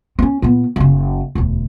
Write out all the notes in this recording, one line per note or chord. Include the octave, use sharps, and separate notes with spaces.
C4 C#4
A#2 B3
F#1 C#3
E1 D2